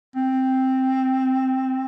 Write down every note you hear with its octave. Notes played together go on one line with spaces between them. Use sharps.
C4